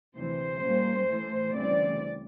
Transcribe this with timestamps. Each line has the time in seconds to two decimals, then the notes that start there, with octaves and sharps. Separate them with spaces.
0.16 D2 C3 E3 C5
0.61 A#2 G3 A#3 C#4
1.07 A2 E3 A3
1.52 D2 C#3 E3 G3 C4 D5